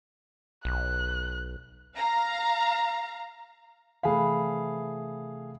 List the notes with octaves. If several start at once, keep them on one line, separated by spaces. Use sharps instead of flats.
B1 F#6
F5 A#5
C3 E3 A3 G#4 F5 B5